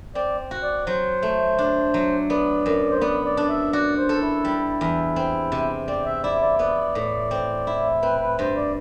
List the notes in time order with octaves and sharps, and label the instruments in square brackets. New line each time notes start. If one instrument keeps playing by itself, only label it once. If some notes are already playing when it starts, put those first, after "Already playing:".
[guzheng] C4 [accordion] D5
[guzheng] F#4
[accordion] D5
[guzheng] F#3 [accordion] C5
[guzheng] A3
D4
F#3
[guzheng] B3 [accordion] D5
[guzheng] F#2
[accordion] C5
[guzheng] B3 [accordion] D5
[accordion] D5
[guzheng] D4
[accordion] E5
[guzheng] F#4 [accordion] D5
[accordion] C5
[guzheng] A4
[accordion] E4
[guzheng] G3
E2
C4
C3
[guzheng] C4 [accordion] D5
[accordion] E5
[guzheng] E4 [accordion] D5
[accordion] D5
[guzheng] B3 [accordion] D5
[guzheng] A2
C4
E4
[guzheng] C4 [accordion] B4
[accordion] B4
[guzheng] G2 [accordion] C5
[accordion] D5